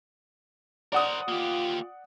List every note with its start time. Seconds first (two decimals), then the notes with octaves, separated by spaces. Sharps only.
0.92 A#4 C5 D5 F#5 D#6
1.28 A#3 F4 G4